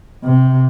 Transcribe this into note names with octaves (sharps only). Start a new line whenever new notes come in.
C3